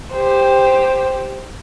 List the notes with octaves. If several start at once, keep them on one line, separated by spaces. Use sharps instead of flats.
G4 C5